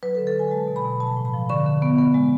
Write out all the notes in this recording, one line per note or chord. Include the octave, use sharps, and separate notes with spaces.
F#3 B4
A4
D3
A4
D3 G#5
G#3 A5
B2
B5
B2
F3 A5
A2
B5
F3
D3 C#6
D3
B3
B3
G#3